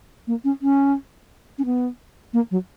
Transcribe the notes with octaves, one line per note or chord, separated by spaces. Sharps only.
A#3
C#4
C#4
C#4
B3
A#3
F#3